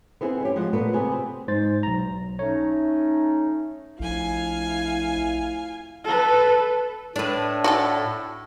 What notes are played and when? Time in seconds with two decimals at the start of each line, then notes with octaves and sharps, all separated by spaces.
0.21 B3 C4 E4 G#4
0.41 G3 C#4 G4
0.56 F3 G#3 F#5
0.73 A#2 A3 B3
0.93 C3 B3 G#4
1.12 C4
1.48 G#2 C5 A6
1.83 B1 A#5
2.39 A3 C#4 D#4 C#5
4.00 A#1 F2 A3 E4 F5 G#5
6.04 A4 B4
7.16 A2 D4 B4
7.64 F#4 G4 A4